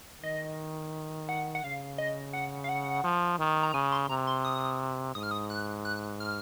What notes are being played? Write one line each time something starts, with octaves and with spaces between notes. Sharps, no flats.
D#3 D#5
F#5
F#5
C#3 F5
D#5
F#5
F5
F#5
F3
D#3
A#5
C#3 G#5
C6
C3 A#5
C6
D#6
G#2 D#6
F6
D#6
F#6
F#6
F6